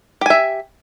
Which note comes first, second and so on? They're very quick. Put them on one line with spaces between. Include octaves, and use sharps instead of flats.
G4 G#5 E5